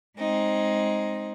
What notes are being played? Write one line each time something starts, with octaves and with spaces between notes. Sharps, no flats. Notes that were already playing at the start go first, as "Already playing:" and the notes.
G#3 C4 D#4